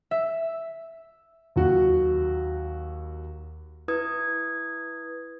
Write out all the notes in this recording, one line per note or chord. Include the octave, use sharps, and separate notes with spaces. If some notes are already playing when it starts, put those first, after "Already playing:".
E5
D#2 F#3 F#4
E4 B4 D#6 G#6